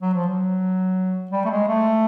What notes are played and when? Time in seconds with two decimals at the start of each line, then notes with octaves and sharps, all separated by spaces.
0.01 F#3
0.14 F3
0.28 F#3
1.31 G3
1.45 A3
1.50 G#3
1.68 A3